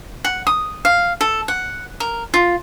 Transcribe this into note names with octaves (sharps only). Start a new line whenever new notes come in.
F#5
D#6
F5
A4
F#5
A#4
F4